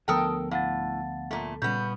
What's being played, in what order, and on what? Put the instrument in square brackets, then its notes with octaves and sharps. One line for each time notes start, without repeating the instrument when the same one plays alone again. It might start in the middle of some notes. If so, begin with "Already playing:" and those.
[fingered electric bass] D2 F3 B3 [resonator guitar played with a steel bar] A4 A#4 G5 [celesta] A5 D#6
[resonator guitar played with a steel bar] A2 [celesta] F5 F#5 A6
[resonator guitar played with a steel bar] A#2 A3
[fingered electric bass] A#2 G3 [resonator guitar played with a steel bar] C#3 B3 [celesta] G6